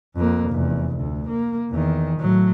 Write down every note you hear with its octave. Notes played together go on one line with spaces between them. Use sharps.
F2 A#3
F1 E2
D2
A#3
E2 D#3
A2 F#3